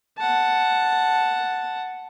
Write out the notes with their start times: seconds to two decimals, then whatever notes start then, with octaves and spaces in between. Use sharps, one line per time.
0.18 F#5 A5